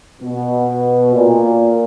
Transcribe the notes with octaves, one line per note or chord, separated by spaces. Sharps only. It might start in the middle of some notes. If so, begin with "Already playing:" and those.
B2
A#2